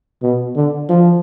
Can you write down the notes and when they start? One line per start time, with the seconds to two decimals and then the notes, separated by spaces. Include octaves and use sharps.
0.22 B2
0.56 D3
0.89 F3